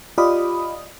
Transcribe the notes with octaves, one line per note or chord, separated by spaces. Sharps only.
F4 G4 D5 D#5 B5 D#6